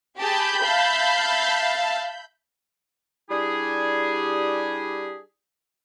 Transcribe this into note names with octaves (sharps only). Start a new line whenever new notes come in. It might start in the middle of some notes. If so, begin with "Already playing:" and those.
G4 G#4 A5 B5 G6
E5 F5 A5
G3 D4 E4 G4 G#4